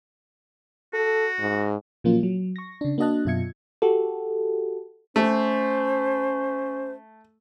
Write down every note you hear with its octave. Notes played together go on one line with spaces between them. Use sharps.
F#4 A4
G#2
A#2 F3 F#3 A#3 C#4 F4
F#3
C#6 A#6
C#3 D4
A#3 D4 F#4 D#5 A5 F#6
F#2 B2 F4 E5 G#6 C#7
F#4 G4 A4
A3 C#4 C5